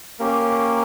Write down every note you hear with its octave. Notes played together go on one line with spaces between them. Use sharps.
A#3 C#4 G4 A#4